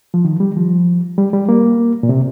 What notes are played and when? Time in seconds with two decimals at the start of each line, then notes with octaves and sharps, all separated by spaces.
0.14 F3
0.25 D#3
0.40 G3
0.56 F3
1.18 G3
1.33 G3
1.49 A#3
2.03 A#2
2.09 C3